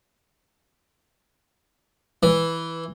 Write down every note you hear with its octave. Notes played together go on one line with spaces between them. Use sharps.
E3